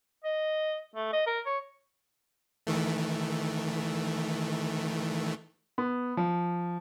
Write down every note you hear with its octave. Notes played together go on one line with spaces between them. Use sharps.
D#5
A3
D#5
A#4
C#5
D#3 E3 A3
B3
F3